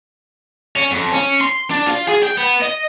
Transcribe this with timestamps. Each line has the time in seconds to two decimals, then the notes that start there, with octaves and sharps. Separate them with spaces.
0.76 C#4
0.91 F2
1.12 C#4
1.41 C6
1.70 D4
1.86 F4
2.08 G#4
2.23 G5
2.37 B3
2.62 D#5